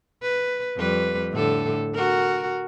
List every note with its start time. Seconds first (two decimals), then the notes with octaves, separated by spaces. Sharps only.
0.22 B4
0.77 F2 G3 B4
1.32 A2 D3 A4
1.94 F#4 A#4